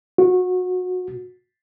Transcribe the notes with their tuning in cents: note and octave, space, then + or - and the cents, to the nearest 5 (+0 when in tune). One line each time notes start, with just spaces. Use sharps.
F#4 -25